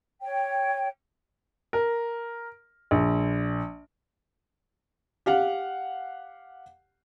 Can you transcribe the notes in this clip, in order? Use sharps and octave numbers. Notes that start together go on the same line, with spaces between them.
C#5 G5
A#4
A#1
G4 F5 F#5